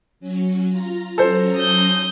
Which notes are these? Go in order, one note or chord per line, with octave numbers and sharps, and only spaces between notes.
F#3 C#4
F4 A#5
F#3 C#4 A4 C5 A#5
D#6 G6